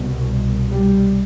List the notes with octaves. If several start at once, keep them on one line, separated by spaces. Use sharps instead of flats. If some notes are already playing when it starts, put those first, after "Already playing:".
Already playing: C2 B2
G3